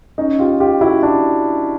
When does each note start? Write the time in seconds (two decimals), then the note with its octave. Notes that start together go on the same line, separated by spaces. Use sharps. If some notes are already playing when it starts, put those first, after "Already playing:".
0.18 C#4 D#4
0.39 F4 G4
0.60 F4 G4
0.81 E4 F#4
1.03 D4 E4